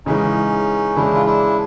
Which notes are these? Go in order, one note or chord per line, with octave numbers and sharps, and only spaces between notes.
C#3 E3 G#3 C#4 D#4
C#3 E3 G#3 D4 E4
F4
D4 E4